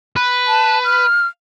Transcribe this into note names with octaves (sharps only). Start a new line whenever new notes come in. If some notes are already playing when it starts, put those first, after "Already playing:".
B4
A5
F6